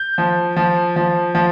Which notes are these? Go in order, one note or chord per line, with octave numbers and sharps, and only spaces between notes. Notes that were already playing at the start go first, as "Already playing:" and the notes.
Already playing: G6
F3
F3
F3
F3